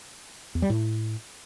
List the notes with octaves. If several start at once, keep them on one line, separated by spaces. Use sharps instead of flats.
E2
G3
A2